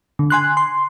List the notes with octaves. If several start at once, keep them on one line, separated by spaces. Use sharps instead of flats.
D3
G#5 C6 F#6
C6